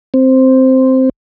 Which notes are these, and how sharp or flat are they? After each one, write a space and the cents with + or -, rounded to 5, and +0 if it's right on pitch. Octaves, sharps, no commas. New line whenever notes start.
C4 +0